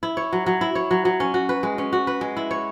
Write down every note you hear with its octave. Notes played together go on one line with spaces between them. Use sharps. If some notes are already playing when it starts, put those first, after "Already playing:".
E4
C#5
F#3
F#3
E4
C#5
F#3
F#3
C#4
F#4
B4
G#3
C#4
F#4
B4
G#3
E4
C#5